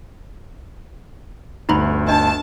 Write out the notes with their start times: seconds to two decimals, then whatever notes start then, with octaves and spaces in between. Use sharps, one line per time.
1.69 G1 D2 D#4 A#5 B5
2.09 D4 D#5 A5